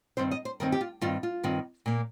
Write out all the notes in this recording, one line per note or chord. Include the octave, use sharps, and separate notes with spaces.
G2 D#3 C4 C5
D#5
C5
G2 D#3 C4 A#4
G4
F4
G2 D#3 C4 F4
F4
G2 D#3 C4
A#2 A#3